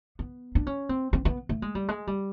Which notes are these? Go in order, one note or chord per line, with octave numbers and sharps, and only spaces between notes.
B3
D4
C#4
C4
C4
B3
A3
G#3
G3
G#3
G3